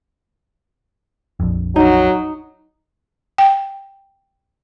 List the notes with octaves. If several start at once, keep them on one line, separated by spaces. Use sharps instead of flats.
A#1 F2
F#3 D#4
G5